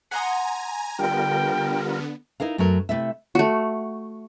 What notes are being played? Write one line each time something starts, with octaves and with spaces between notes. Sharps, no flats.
F#5 G#5 A#5 C6 D#6
D3 G3 B3 F4 A#4 G5
D#4 E4 A#4 F5
F#2 F#3 A3 F#4 A#4
C3 D#3 A3 E4 E5
A3 F#4